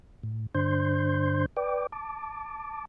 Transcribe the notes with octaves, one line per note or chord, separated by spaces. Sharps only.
A2
G2 D3 D4 C5 C6 G6
B4 D5 G5 D6
A5 D6